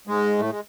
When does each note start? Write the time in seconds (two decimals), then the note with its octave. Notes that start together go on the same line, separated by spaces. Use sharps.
0.07 G#2 G#3
0.39 A2 A3
0.49 G#3